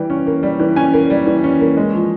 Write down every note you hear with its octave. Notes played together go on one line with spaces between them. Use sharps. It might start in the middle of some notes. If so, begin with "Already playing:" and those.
Already playing: E3 G3 G5
C#4
A#3
G3
E3
C#4 G#5
A#3
G3
E3
C#4
A#3
G#3
F3